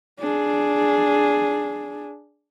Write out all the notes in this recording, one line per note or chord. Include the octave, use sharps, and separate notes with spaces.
D4 G#4